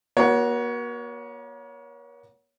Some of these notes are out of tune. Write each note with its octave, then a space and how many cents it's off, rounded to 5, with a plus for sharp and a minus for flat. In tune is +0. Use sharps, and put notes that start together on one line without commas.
A#3 +45 F#4 +0 C#5 +20